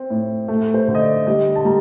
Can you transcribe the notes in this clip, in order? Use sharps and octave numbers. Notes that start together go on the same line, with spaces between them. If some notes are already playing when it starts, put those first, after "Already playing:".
Already playing: C4
A2
A3
C5
D3
D#5
D5
G3 D#5
A5
G3 A#5